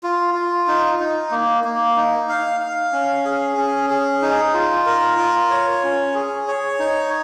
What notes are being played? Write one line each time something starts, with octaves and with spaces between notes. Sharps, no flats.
F4
F4
D#4
D#4
A#3
A#3
D#4
F5
F5
C#4
G#4
C#4
G#4
D#4
F4
A#4
F4
C#5
C#4
G#4
C#5
D#4